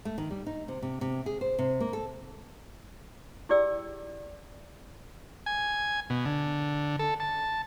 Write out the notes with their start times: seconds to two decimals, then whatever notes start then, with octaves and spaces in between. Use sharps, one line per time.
0.05 A3
0.18 D#3
0.30 G3
0.47 D#4
0.68 C3
0.82 C3
1.01 C3
1.26 G#4
1.41 C5
1.59 C3
1.80 A#3
1.93 A4
3.49 E4 G4 G#4 D5 G5 E6
5.46 G#5
6.10 B2
6.25 D3
6.99 A4
7.20 A5